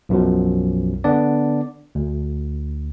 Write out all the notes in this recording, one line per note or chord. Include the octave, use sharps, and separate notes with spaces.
B1 F#2 B2 F3
D3 B3 D4 D5
D2